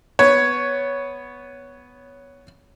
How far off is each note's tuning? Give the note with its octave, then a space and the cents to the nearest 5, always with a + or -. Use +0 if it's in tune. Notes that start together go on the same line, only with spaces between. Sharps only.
B3 +0 C#5 +5